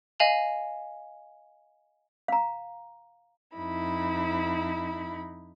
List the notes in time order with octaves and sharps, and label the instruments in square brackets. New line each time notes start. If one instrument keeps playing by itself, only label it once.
[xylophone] D#5 F5 G#5 F7 F#7
[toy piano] F5 A#5
[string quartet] F2 D#4 E4 B5